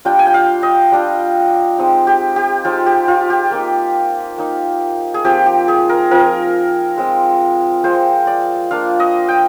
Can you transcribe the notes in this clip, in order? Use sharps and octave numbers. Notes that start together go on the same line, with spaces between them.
G3 D4 F4 G5
G#5
G5
F5
D#5
G3 D4 F4
G#3 C4 D#4
G4
G4
G#3 C4 D#4 F4
G4
F4
G4
A#3 D#4
A#3 D#4
G#4
F3 C4 F4 G4
G4
G#4
A#4
F3 C4 F4 A#4
G#3 C4 F4
G#3 C4 F4 C5
D5
A#3 D4 F4 F5
D#5
G5